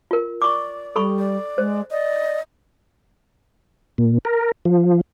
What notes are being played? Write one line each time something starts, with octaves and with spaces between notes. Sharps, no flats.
F4 A#4
D5 C#6 D6
G3 A4 B5 C#6
D5
G#3 C5
D5 D#5
A#2
A#4
F3